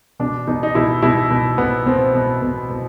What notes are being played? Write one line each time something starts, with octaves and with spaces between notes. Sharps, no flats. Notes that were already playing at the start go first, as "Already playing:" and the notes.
B2 D4
B2 D#4
D#4
B2 E4
B2 E4
B2
B2 B3
B2 C4
B2
B2
B2